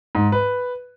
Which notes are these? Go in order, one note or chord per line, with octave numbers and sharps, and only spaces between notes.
G#2
B4